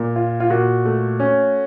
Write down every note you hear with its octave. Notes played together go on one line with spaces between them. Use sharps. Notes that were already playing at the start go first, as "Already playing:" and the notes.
Already playing: A#2
F4
F4
A#2 F#4
A3
C#4